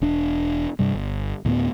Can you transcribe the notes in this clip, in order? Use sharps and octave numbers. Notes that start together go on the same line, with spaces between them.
E1 D4
G2 C3 G3
G1
D2 A2 F#3 B3